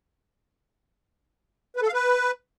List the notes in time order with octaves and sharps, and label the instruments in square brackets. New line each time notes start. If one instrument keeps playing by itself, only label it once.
[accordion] B4
A4
F5
B4